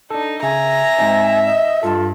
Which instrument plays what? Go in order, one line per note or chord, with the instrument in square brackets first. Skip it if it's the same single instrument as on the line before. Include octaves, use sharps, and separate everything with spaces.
[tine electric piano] D4 A4 [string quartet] D#4
[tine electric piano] C#3 [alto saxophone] E5 [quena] G#5 [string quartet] A#5
[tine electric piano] G#2 C4 D#4
[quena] D#5
[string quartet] G2 [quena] F4 [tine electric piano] A4 A5